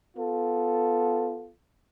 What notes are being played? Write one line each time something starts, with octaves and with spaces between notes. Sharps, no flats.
B3 F4 A4